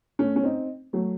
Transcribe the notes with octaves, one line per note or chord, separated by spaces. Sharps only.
A3 C#4
C#4
C4 D#4
F#3 A3